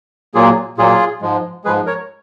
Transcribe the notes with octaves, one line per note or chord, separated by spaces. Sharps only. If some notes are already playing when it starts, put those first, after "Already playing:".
A#2 F#3 A#3 F4 G#4
A#2 F#3 A#3 F4 G#4
G#2 F3 G#3
G#2 F3 G#3 G#4 B4
A#4 C#5